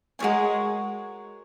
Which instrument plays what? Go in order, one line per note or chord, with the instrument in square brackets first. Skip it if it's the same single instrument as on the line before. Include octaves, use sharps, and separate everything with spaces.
[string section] G#3 [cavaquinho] F#4 A#4 C#5 G#5